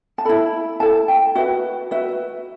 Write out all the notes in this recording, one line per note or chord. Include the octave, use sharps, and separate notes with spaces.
A5
E4 A4 B5
E4 A4 A5
G5
F#4 B4 E5
F#4 B4 E5